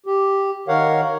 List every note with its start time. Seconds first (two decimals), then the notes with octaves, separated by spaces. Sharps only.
0.06 G4
0.68 D#3 A#4 C#5 F5 F#5